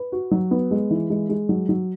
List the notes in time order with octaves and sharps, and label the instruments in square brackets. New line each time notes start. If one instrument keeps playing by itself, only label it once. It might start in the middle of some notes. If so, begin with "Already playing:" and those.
Already playing: [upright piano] B4
F#4
F#3
B3
G#3
E3
G#3
G#3
F#3
F#3